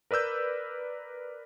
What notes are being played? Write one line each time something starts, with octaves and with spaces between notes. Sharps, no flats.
A#4 B4 D5 E6 G6